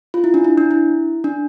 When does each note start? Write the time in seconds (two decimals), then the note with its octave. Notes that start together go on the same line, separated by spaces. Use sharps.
0.14 F4
0.24 E4
0.34 D4
0.44 E4
0.58 D4
0.71 E4
1.24 D4